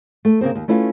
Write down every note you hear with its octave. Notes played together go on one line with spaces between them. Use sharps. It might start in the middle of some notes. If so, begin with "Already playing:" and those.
A3
C#3 A#3 C4 C5
D#2
A3 C#4 E4 F4 A#4 B4